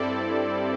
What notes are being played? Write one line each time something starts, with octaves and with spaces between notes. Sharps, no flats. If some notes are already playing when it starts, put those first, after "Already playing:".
Already playing: G2 G3 C4 E4 A4 D5